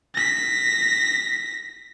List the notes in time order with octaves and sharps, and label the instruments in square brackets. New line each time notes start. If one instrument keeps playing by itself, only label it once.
[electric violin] A#6 B6